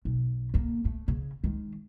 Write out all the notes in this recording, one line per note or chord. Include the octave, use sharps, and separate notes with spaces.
B1
D3 A#3
A3
C#3
D#3 G#3